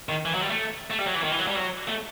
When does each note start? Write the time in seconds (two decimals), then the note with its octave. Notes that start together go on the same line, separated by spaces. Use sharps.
0.09 D#3
0.26 E3
0.34 F#3
0.42 G3
0.50 A3
0.91 A3
0.99 G3
1.07 F#3
1.15 E3
1.23 D#3
1.31 E3
1.39 F#3
1.48 G3
1.56 F#3
1.88 A3